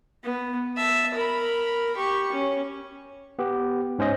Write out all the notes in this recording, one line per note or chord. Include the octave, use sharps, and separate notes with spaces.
B3
E5 A5
A#4 B5
G4 C#6
C#4
B3 G4
G#2 C#4 C5 D#5